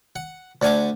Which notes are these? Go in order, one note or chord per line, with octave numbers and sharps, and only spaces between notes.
F#5
D2 D5 F#5 G#5 A5 D6